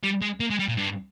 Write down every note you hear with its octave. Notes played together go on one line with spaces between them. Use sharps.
G3
G#3
A#3
G#3
G3
A#2
G2